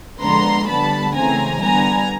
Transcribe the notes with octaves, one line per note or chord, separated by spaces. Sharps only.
D3 F3 G#3 B3 A#5 C6
D3 G3 B3 A5 B5
C#3 E3 A3 C4 G#5 A#5
D3 G3 B3 G#5 A#5